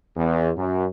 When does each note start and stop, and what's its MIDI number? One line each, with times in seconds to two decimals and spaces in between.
0.16 0.48 40
0.56 0.86 42